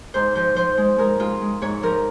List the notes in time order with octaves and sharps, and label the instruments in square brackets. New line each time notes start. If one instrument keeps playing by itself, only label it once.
[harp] G#2 C5
F3 C5
F3 C5
G#3
G#3 A#4
G#3 F4
G#3
G#2 C#5
F3 A#4